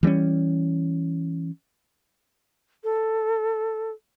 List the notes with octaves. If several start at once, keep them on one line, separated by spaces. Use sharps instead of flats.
E3 G3 C4 C#4
A4